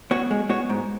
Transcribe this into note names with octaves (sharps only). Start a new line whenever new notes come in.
B3 F#4 C#5
G#3
B3 F#4 C#5
G#2